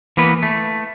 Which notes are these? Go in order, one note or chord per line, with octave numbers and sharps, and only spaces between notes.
E3 A#3 B3 B4
A3